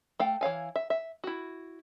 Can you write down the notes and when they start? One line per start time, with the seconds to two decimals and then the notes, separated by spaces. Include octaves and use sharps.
0.19 A3 F5 G5
0.41 E3 C#5 F5 G#5
0.76 E5
0.90 E5
1.24 E4 F#4